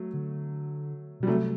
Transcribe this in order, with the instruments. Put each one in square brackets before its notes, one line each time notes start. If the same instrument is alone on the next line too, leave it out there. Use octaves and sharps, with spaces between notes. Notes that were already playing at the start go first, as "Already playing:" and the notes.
Already playing: [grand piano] F#3 A3
[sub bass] D3
[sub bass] B2 [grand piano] G3
[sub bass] C3 [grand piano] F#3 A3